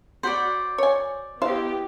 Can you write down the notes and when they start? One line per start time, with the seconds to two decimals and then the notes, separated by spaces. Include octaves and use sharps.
0.23 F#4 C5 D5 F#5 B5
0.78 C#5 G#5
1.42 B3 E4 G4 C5 D#5 F5